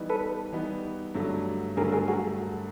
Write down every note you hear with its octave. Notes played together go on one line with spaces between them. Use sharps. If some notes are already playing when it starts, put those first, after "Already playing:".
Already playing: E3 G3 B3 D#4
A4 B4
E3 G3 B3 D#4
G2 D3 F#3 A3
G2 D3 F#3 A3 G#4 A#4
G#4 A#4
F#4 G#4